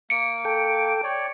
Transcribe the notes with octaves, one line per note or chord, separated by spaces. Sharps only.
A#3 C#7 D7
A4 G5
C#5 D5 G5